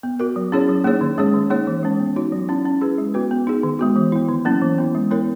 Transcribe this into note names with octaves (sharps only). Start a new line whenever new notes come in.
B3
F#4 A#4
F#3
C#4 E4 G#4 C#5
F#3
A#3 D#4 G#4 C#5
D#3
G#3 C#4 G#4 C#5
D#3
A#3 D#4 G#4 C#5
E3
G#3 C#4
B3
D#4 F#4 C#5
F#3
C#4 E4
C#4
E4 G#4 B4
G#3
B3 F#4 B4
B3
D#4 G#4
D#3
G#3 B3 F#4
E3
B3 E4
D#3
F#3 A#3 C#4 E4
E3
B3 E4
G#3
B3 E4 A#4 C#5